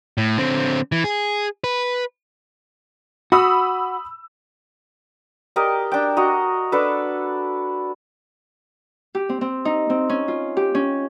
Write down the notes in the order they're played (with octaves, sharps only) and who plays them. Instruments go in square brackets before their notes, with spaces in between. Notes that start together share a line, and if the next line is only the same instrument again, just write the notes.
[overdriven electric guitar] A2
D3 C4
E3
G#4
B4
[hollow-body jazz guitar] F#4 [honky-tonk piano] B5 D#6 E6
[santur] G4 A#4 D5 D#5
D4 G5
F#4 D#5 A#5
D4 A4 B4
[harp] G4
C4
C4
D#4
C4
C#4
F4
G4
C#4